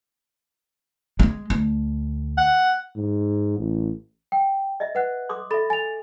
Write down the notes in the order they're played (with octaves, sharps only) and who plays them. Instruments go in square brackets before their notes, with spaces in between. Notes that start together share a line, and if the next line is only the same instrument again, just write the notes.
[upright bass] G3 G#3
D2
[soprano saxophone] F#5
[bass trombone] G#2
A1
[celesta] G5
[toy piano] D#5 E5
[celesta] B4 F#5 F#6
[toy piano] C6 D6 D#6
[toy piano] A4 E5 [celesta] B5 A6
[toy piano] G#5 [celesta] A6 F7